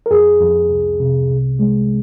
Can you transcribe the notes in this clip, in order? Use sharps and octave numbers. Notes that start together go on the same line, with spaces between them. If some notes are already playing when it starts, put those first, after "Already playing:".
A#4
F2 G#4
F2
C2
C3
C2
G#3